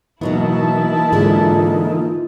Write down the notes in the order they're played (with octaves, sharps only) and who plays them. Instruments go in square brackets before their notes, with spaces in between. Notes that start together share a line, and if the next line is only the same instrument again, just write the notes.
[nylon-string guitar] B2 F#3 B3 [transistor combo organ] E3 A#3 D#4 [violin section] E4 A5
[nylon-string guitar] G#2 D3 G#4 [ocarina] F4